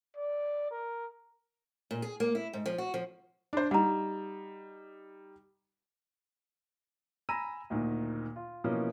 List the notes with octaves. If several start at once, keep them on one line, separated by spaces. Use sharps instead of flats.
D5
A#4
A#2
G#4
A#3
E4
G#2
F3
F#4
F3
D4 C5
G3 D#4 F#5 A#5
G#5 A#5 B5 E6 A#6 D#7
D2 A#2 D#3
F4
B2 E3 F3 A#3 C#4